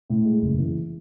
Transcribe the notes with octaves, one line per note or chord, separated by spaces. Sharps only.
A2
G#3
F#1
E3